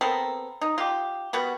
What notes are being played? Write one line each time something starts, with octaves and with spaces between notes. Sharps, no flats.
B3 C4 A4 A#4
D#4
F4 G4
G3 B3 F#4